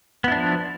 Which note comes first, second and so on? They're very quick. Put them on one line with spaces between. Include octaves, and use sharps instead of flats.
B3 E4 D4 F3